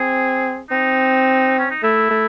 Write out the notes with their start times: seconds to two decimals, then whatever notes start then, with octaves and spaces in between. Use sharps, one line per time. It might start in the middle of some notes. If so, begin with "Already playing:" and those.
Already playing: C4 G#4
0.70 C4 D#4
1.59 C#4
1.71 D#4
1.83 A3 E4
2.10 A3